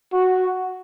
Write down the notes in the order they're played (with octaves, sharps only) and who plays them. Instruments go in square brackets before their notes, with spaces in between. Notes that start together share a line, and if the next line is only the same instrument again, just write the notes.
[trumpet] F#4